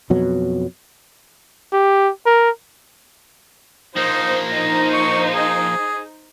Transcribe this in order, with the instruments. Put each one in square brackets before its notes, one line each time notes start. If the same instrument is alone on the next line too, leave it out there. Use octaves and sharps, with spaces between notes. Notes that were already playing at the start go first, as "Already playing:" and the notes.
[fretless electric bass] F2 B2 F#3
[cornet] G4
A#4
[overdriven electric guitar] F3 A#3 [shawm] D#4 [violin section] C5
[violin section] D#4 C5 [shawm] A#5
[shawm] C#6
G#4